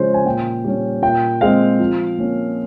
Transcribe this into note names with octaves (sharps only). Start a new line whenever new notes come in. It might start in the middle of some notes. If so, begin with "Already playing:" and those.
Already playing: C#3 F3 G#3 C#4 C5
G#5
A#2 G5
G3 C#4
A#2 G5
G#3 C4 F5
F3
A#3 C#4